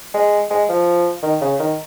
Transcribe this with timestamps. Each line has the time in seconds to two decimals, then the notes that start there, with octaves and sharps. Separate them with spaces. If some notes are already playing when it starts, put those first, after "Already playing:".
0.14 G#3
0.50 G#3
0.69 F3
1.23 D#3
1.41 C#3
1.59 D#3